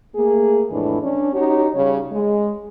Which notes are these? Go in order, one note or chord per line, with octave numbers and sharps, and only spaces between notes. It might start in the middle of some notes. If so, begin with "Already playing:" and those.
A3 A#3 G#4
F2 A2 E3 G#3 D4
C#4 D4
C#4 D#4 F#4 G4 C#5
C#3 G3 C#5
G#3